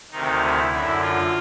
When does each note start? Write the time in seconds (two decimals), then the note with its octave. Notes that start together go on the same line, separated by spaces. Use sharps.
0.11 D2 C3 D#3 D#4
0.42 E4
0.70 F#2 D3 E4
1.01 F4